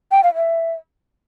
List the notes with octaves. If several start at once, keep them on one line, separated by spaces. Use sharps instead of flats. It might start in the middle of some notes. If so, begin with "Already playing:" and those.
G5
F5
E5